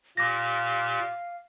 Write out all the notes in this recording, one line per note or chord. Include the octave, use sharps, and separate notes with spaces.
A#2 G4 F5 D6 A#6